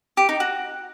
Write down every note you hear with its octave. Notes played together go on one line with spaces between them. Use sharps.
G4
D#4
F#4